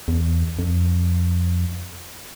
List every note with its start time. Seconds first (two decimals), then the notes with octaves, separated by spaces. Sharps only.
0.08 E2
0.59 F2